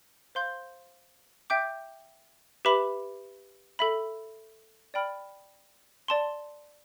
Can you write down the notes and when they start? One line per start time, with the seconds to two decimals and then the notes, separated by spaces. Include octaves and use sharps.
0.35 C5 F5 C6 G6
1.50 E5 G5 D6 G6
2.65 G4 B4 E5 B5 D6
3.79 A4 E5 B5
4.94 D5 G5 B5 F6
6.08 D5 A5 C6